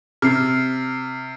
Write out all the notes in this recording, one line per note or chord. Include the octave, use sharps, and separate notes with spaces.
C3 F6 C7